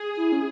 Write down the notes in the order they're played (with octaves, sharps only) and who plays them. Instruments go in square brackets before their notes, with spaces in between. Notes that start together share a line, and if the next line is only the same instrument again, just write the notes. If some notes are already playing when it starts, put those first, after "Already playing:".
Already playing: [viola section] G#4
[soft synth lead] E4
C#4